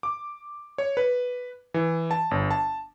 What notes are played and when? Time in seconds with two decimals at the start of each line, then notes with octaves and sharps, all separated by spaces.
0.03 D6
0.78 C#5
0.97 B4
1.74 E3
2.11 A5
2.31 G1
2.51 A5